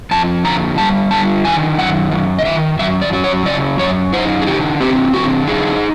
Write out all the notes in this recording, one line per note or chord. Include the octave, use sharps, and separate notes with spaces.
F2 A5
D3 A#5
G3 A5
D3 A5
D#3 G#5
F#2 F#5
F#2
D#5
D#3 E5
F#2 E5
D5
F#3
C#5
C#3 D5
F#2 C#5
D#4 C5
G#4
D3 G4
C4 G4
D3 F#4
D#4 G#4